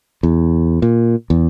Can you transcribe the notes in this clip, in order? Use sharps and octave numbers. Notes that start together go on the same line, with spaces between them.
E2
A#2
E2